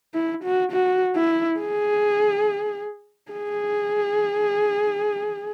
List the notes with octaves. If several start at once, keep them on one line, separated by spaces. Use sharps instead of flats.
E4
F#4
F#4
E4
G#4
G#4